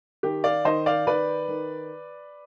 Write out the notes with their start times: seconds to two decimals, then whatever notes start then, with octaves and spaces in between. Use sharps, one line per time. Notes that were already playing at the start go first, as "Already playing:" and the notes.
0.23 D#3 G4
0.44 D5 F5
0.65 D#3 C5 D#5
0.86 D5 F5
1.07 D#3 B4 D5
1.48 D#3